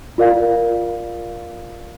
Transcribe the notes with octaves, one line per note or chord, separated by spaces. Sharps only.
F4 A#4 D5 F5